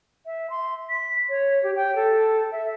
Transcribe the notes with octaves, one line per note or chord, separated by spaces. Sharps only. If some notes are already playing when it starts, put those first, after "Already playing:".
E5
C6
B6
C#5
G4
G5
A4
E5